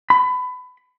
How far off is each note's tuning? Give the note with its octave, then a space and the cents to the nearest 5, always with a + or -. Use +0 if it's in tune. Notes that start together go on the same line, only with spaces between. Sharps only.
B5 +25